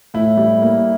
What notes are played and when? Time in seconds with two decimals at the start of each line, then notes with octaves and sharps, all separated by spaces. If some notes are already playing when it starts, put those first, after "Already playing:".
0.14 A2 E4
0.37 G3
0.62 A#3